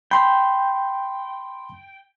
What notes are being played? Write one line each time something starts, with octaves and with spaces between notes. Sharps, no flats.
G5 B5 C6